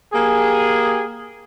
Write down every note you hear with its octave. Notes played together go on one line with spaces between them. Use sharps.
A#3 G4 G#4